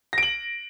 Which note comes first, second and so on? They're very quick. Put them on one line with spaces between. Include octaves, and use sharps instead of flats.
A#6 D7 F#7